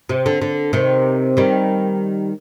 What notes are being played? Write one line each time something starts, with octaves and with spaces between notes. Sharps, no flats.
C3
D3
D3
C3 D#3
D#3 G3